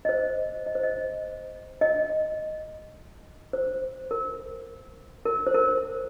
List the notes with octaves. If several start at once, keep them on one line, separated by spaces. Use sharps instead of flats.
D#5
C5
D#5
C5
D#5
D#5
C5
A#4
A#4
C5
A#4